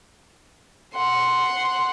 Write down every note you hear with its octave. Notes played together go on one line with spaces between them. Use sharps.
F#5 C6